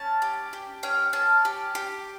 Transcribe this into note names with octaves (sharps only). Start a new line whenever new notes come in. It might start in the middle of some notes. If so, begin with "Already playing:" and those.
Already playing: C#4 A5
G4
G4
C#4 G5
C#4 A5
G4
G4